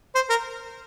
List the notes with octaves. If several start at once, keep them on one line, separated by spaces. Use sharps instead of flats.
C5
A#4